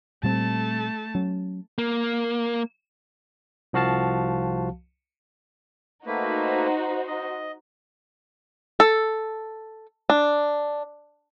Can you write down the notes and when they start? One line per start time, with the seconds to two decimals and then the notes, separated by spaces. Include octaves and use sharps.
0.23 A#2 G3 A3 C4 A5
1.15 F#3 C#4
1.78 A#3
3.73 C2 F3 F#4 F5 A5
6.06 A3 A#3 D#4 F#4 B4 C5
7.07 D#5
8.80 A4
10.10 D4